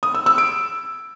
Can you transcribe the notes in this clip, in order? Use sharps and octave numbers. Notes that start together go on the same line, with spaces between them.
D#6
E6
E6
D7